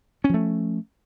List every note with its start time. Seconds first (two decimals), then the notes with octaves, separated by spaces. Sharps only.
0.24 C#4
0.29 F3
0.34 A3